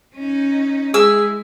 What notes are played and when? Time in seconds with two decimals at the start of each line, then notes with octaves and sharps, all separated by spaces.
0.15 C#4 D#4
0.94 G#3 E4 G#4 E6